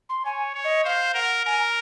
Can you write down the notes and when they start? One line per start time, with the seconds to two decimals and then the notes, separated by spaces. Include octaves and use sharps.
0.09 C6
0.25 C#5 G#5
0.55 C#5
0.64 D#5
0.84 C5 F5
1.14 A#4 F#5
1.45 A#4 G#5
1.60 A#5